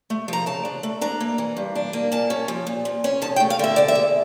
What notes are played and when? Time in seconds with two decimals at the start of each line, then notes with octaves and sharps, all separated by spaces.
0.10 A3
0.28 F3 A#5
0.46 C#3 A5
0.65 D4
0.83 A3
1.01 D4 A#5
1.21 A#3
1.38 E3
1.57 G2
1.75 D4
1.93 A#3
2.12 A#2 A5
2.30 C#4
2.48 F3
2.67 A#2
2.85 A#2
3.04 C#4
3.22 E2 A5
3.36 G5
3.40 A3
3.50 F5
3.59 D3 E5
3.76 E2 D5
3.88 E5
3.95 E2